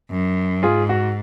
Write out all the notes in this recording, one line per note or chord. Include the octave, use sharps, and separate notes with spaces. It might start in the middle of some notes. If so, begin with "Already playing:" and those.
F#2
G#2 F4 G#4
F#4